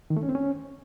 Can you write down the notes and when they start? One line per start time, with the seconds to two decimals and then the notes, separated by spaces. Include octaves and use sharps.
0.10 D#3
0.16 A3
0.23 C#4
0.29 C4
0.35 C#4